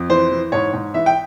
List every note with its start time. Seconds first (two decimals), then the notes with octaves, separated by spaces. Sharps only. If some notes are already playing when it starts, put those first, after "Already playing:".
Already playing: F2
0.10 E3 C5
0.31 E3
0.52 G#2 C#5
0.73 G#2
0.94 E3 E5
1.06 G5